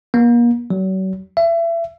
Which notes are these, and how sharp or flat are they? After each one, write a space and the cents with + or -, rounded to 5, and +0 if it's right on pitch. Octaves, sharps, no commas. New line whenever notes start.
A#3 +35
F#3 +40
E5 +30